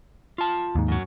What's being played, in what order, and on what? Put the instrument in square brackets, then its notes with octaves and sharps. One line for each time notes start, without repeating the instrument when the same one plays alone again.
[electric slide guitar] F4 A5
[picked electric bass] D#2 G#2
[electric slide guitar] F#2 F#3